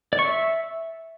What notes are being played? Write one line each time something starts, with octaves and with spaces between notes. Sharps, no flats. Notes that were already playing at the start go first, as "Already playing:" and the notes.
D5
C#6
E5